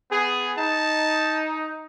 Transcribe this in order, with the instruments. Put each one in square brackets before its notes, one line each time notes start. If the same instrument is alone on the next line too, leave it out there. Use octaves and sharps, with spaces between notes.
[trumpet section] B3 G#4
[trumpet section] D#4 [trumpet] A5